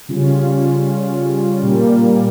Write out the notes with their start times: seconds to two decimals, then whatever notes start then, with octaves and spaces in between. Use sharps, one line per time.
0.09 C#3 G3 C#4 F4
1.62 A#2 G3 A#3